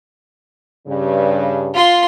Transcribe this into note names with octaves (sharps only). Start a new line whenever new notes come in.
G2 C#3
F4 C6